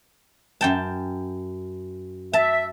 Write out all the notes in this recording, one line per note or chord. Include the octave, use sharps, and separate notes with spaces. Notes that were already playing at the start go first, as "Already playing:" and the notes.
F#2 G5 A5
E5 A5